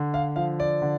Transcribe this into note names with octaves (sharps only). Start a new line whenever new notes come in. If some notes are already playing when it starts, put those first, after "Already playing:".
Already playing: D3
F5
F3 F5
D5
D3